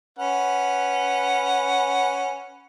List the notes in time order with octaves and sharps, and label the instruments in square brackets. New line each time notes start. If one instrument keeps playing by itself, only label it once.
[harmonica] C#4 B4 F#5